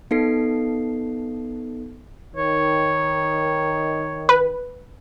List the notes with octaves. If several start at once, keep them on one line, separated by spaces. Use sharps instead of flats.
B3 D#4 A4 C7
D#3 C#5
B4